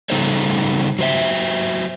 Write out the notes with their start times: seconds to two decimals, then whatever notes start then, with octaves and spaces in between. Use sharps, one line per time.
0.10 C#3 G3 D#4 A4 C5 C#5
0.99 F#3 C5 E5